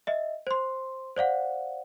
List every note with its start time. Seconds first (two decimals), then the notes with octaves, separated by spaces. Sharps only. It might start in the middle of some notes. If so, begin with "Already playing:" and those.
0.07 D#5 E5
0.47 C5 C6
1.17 C5 D5 F5 F#5